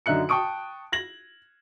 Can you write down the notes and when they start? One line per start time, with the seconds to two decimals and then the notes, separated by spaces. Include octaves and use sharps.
0.06 F#2 D3 D#4 E5 F#6 C#7
0.29 G5 A5 C#6 D#6 D7
0.92 G#6 A#6 F#7